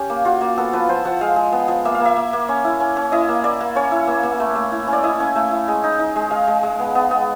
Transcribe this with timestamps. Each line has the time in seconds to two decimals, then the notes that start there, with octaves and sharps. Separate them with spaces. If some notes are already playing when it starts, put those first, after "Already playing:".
Already playing: C#4 G4
0.10 A#3
0.25 F4 F#4
0.41 A#3
0.57 B3 A4
0.73 F3 B4
0.89 F3 C5
1.05 F3 F#5
1.21 G#3 F5
1.36 G#3
1.53 B3
1.68 F3
1.85 A#3 E5
1.95 F5
2.00 A#3 E5
2.16 A#3
2.33 A#3
2.48 C#4
2.64 E4
2.80 C#4
2.97 C#4
3.12 E4 D#5
3.29 A#3
3.44 A#3 D5
3.61 A#3
3.75 C#4 C#5
3.92 E4
4.07 A#3
4.23 A#3
4.40 A3
4.56 A3
4.72 E4
4.87 C#4
4.93 D5
5.03 E4 D#5
5.20 C#4
5.36 A3
5.51 E4
5.68 G#3
5.84 D#4
5.99 D#4
6.16 G#3
6.31 G#3 F5
6.47 G#3
6.63 G#3
6.79 B3
6.95 B3
7.11 B3